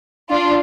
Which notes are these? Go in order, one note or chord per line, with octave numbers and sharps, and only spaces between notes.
D4 F4